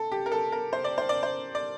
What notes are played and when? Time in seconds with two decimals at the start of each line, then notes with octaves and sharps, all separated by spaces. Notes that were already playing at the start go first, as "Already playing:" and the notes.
Already playing: A4
0.12 G4
0.26 A#4
0.32 A4
0.52 A#4
0.73 C5
0.84 D5
0.98 C5
1.09 D5
1.23 C5
1.55 D5